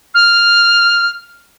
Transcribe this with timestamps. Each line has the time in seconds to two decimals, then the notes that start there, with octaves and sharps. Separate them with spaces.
0.14 F6